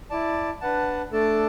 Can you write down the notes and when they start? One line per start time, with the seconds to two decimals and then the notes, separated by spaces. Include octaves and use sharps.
0.10 E4 D5 A5
0.61 D4 B4 F#5 A5
1.12 A3 D4 A4 D5 A5